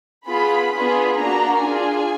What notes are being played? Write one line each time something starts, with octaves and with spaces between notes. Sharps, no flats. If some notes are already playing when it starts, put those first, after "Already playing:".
B3 F4 G#4 B5
B3 D4 F4 G#4 B5
A#3 D4 F#4 A#5
D4 F4 G#4 G#5